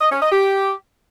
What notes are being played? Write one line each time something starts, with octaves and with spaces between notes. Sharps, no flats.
D#5
C#4
D#5
G4